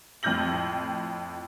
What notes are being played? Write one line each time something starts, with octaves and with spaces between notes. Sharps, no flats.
F2 A2 F6 G6 A#6 F#7